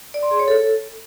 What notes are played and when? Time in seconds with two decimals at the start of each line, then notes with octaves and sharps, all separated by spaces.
0.14 D5
0.23 C6
0.31 G#4
0.39 C#5
0.48 A4